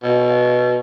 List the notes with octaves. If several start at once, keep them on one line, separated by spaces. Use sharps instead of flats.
B2